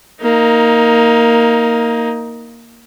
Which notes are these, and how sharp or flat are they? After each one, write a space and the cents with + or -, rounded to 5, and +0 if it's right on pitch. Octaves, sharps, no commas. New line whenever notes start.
A#3 +0 D#4 +15